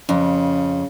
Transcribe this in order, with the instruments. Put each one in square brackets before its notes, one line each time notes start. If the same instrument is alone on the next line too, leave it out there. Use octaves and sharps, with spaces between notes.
[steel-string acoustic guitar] F2 [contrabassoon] C#3